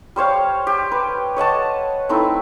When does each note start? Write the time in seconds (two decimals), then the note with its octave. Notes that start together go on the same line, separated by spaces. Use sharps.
0.16 G3 C5 C#5 F5
0.67 G4
0.92 B4
1.36 C#5 D#5 F#5 A5
2.09 A3 C4 D#4 E4